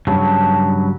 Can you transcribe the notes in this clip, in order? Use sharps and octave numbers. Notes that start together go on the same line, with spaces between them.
G2 C#3 F#3 A5